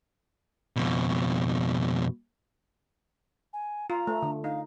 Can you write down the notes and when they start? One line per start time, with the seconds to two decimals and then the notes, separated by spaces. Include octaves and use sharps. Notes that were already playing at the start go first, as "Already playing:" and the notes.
0.76 F2 B2
3.53 G#5
3.90 F4 A#5
4.07 A3
4.22 D3
4.44 D#4 F5